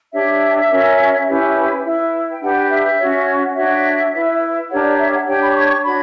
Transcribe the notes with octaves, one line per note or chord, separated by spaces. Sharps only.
D4 G4 C#5 E5
C#4 F#4 A#4 C#5
C#4 E4 G4 B4
E4 B4
G5
D4 G4 B4 F#5
E5
C#4 F#4 C#5
D4 F#4 C#5 E5
E4 B4
D4 G4 A#4 C#5 F#5
D5
E5
F#5
D4 G4 C#5 G5
B5
D6
C#6
C#6
D4 F#4 C#5 B5